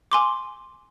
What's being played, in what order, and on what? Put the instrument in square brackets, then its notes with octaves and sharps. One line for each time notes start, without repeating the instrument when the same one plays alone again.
[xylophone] G#5 C6 D6